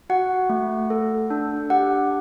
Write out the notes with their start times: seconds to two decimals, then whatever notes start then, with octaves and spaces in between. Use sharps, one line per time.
0.10 F#4 F#5
0.49 A3
0.90 A4
1.30 D4
1.70 G4 F#5